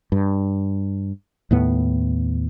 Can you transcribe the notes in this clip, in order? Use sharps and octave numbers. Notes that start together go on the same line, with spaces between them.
G2
D#2 A2 B3